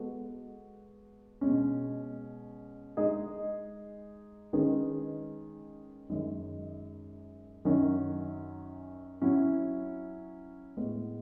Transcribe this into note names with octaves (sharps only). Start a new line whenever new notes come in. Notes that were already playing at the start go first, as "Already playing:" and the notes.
Already playing: G#3 B3 F#4 A4
B2 G#3 C#4
G#3 D#4 G#4 D#5
D#3 G#3 C#4 G#4 B4
F#2 D#3 G#3
F#2 D#3 F#3 C#4 F#4
F#3 C#4 E4
A2 G#3 B3